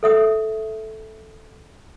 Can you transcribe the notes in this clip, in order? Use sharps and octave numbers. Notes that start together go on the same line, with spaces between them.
A4 E5 D#6